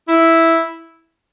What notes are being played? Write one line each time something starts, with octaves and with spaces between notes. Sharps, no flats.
E4